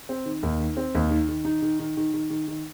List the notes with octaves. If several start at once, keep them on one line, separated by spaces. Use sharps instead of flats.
C4
D#3
D#2
D#3
C4
D#2
D#3
D#3
D#4
D#3
D#3
D#3
D#3
D#3
D#3